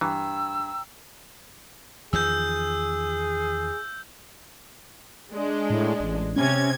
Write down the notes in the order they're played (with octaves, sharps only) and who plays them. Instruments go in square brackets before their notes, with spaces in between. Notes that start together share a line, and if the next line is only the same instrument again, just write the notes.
[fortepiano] G2 [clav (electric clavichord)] E3 [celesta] G5 A#5 [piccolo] E6
[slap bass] E2 D#3 F3 [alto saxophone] G#4 [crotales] E6 G6
[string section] G#3 D4
[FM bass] A2
A1
[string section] C3 G#6 [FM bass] C#4